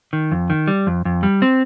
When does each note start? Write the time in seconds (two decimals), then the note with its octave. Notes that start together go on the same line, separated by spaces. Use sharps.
0.13 D#3
0.32 F2
0.50 D#3
0.68 G3
0.87 F2
1.05 F2
1.23 G3
1.42 C4